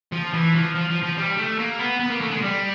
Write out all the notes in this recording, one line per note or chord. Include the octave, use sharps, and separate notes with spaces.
F3
E3
F3
F3
F3
F3
G3
A3
A#3
B3
B3
A#3
A3
G#3
G3